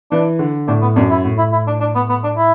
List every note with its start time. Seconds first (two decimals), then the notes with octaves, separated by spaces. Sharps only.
0.11 E3 D4
0.39 D3
0.67 A2 D4
0.82 B3
0.96 F#2 D4
1.10 E4
1.25 A2
1.38 E4
1.52 E4
1.67 D4
1.80 D4
1.95 B3
2.09 B3
2.24 D4
2.37 E4